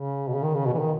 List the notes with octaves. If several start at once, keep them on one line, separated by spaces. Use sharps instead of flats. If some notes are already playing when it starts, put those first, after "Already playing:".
Already playing: C#3
B2
C#3
D#3
C#3
B2
E3
D#3